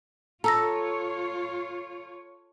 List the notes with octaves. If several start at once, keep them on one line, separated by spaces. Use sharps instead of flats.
F4 A4 C#5 A#5 E6 A#6